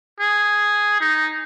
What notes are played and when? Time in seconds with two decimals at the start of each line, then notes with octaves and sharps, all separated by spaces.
0.20 G#4
1.01 D#4